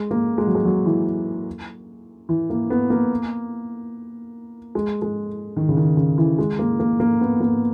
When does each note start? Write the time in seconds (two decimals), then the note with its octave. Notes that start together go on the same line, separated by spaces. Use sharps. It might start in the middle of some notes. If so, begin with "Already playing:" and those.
Already playing: G#3
0.11 A#3
0.38 G#3
0.47 F#3
0.55 G#3
0.65 F#3
0.86 E3
2.29 E3
2.50 A#3
2.70 B3
2.90 A#3
4.75 G#3
5.02 G#3
5.57 D#3
5.69 C#3
5.77 D#3
5.97 C#3
6.18 E3
6.39 G#3
6.59 A#3
6.80 A#3
7.00 A#3
7.21 B3
7.40 A#3